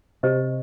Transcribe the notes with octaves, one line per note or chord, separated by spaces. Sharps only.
C3 G4 C5 D#5